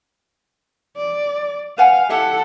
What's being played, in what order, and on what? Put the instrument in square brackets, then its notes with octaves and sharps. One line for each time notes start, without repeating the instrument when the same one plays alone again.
[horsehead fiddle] D5
[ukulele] B4 F#5 G#5 [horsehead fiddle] F5
[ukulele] E4 G4 E5 [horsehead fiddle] A4 F#5